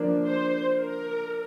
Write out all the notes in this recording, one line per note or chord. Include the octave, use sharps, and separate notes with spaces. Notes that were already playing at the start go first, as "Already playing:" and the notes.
Already playing: F3 A#3 D4
C5
A#4